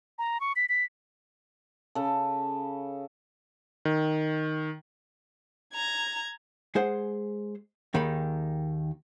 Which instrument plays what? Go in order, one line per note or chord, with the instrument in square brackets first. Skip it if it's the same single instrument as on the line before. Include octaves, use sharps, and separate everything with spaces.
[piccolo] A#5
C#6
B6
B6
[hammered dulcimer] C#3 A4
[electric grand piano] D#3
[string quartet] A#5 G#6
[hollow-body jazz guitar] G#3 G#4 C5 F#5
D#2 D#3 D#4 G#4 B5